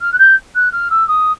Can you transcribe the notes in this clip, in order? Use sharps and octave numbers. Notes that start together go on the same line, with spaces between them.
F6
F#6
G6
F#6
F6
E6
D#6